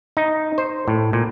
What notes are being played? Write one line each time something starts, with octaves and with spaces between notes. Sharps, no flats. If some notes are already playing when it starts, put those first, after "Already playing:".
D#4
C5
A2
A#2